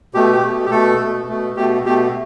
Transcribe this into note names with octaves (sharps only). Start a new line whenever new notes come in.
B2 A3 G4
G4
B2 A3
G4
B2 A3 A4
B2
A3
B2 A3
B2 A3 G4
B2 A3 G4